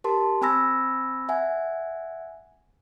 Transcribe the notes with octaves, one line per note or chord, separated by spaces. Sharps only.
G4 A#4 A5 C6
C4 G#5 B5 E6 A#6
E5 F#5 G#5